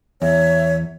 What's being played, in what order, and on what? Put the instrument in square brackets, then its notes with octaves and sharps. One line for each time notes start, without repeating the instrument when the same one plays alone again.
[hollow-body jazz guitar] E2 [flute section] C#5 E5